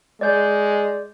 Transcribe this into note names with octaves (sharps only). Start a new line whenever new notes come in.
G#3 D5 G6